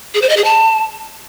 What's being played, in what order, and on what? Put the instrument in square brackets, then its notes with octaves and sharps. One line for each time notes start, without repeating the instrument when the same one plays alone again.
[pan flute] G#4
C5
D#5
G#4
A5